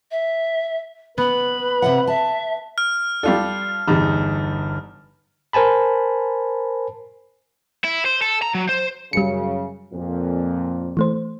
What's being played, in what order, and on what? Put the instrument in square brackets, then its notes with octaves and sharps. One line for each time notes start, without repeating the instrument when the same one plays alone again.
[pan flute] E5
[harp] B3 [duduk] B4 [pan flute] B5
[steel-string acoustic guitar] C3 E5 F#5
[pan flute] E5 [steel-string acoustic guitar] A5
[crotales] F6
[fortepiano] G3 F4 A4 [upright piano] D5
[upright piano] G1 G3 D#4 [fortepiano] E2
[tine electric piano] A#4 C5 G#5 A5 B5
[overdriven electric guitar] E4
C5
A4
A#5
F#3
C5
[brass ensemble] F#2 C#3 [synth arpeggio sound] G3 C#7
[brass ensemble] F2 A#2
[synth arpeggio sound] E3 A3 C5